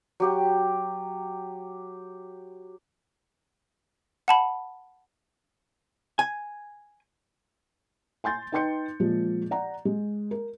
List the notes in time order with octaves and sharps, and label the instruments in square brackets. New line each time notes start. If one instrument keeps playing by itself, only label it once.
[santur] F#3 G4 G5
[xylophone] F#5 A5 B5
[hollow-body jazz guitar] G#5
[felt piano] G#5 C6 G6 A6
D#4 B4 G5 C6 G6 C#7
A#2 F3 G#3
D5 F#5 A#5
G#3
A#4